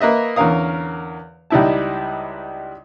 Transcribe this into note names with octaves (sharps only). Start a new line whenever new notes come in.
A#3 B4 D#5 E5
E2 D3 C#4 A#4 F5 D#6
C#2 G3 D#4 E4 E5 A5